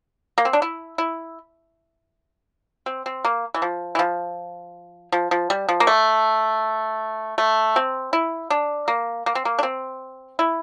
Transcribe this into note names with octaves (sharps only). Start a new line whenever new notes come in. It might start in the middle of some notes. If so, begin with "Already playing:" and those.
A#3
C4
D4
E4
E4
C4
C4
A#3
E3
F3
E3
F3
F3
F3
G3
F3
A#3
A3
A3
C4
E4
D4
A#3
A#3
C4
A#3
D4
C4
E4